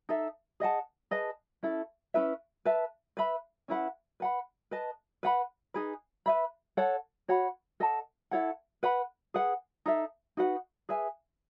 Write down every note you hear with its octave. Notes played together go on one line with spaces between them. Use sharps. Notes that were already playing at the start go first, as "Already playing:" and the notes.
D#4 A4 E5
G#4 D#5 F#5 A5
G#4 B4 D#5 A5
C#4 E4 A4
C#4 E4 B4 E5
B4 E5 A5
B4 E5 B5
C#4 E4 B4 F#5
B4 F#5 B5
B4 D#5 A5
B4 F#5 B5
D#4 G#4 B4
B4 E5 B5
A4 C#5 F#5 A5
F#4 C#5 F#5 B5
A4 D#5 F#5 A5
E4 A4 C#5 F#5
B4 F#5 B5
G#4 B4 F#5
D#4 A4 E5
D#4 F#4 B4 F#5
G#4 B4 E5 G#5